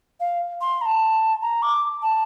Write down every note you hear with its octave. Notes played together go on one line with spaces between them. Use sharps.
F5
C6
A#5
A5
A#5
D6
A5